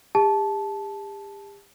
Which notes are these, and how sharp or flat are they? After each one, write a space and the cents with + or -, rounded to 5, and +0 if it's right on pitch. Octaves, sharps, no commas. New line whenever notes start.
G4 +40 A5 -15